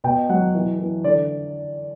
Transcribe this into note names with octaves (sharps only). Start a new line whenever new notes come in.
B2 G5
F#3 F#5
E3
E3
D3 D5